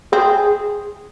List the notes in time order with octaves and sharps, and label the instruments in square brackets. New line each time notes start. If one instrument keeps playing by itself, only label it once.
[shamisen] C4 [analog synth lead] G#4